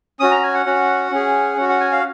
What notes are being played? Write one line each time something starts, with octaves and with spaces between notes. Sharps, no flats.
C#4 F#4 D#6
A#5
G#5
F#5
C#4 F#4
C#4 G#4
C#4 F#4 F#5
F#5
G#5
F5